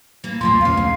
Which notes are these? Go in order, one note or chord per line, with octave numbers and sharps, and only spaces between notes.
E3 A#3
E1 C2 A#2 F3 A#3 C6
F1 D2 A#2 A3 C#4 F5
G#2